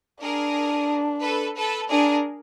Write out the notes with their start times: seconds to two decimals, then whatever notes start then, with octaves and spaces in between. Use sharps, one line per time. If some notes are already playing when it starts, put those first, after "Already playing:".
0.22 D4 G#4 A#4
1.23 A4 B4
1.57 A4 B4
1.90 D4 G#4 A#4